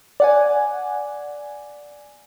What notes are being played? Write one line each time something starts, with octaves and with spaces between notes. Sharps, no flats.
D5 F#5 G#5